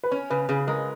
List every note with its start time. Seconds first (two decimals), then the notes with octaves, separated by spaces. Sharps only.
0.03 B4
0.11 C#4 C#5
0.30 C#3 B4
0.49 C#3 G#4
0.67 G#3 A#4